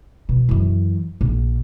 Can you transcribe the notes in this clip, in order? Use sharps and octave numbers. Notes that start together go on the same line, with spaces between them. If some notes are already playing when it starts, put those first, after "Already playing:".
B2
F#2 E3
A#1 A#2